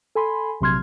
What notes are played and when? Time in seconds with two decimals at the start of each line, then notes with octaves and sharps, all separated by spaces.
0.15 A4 G#5 B5 C6
0.61 A#1 C3 F#3 C6 F6 G#6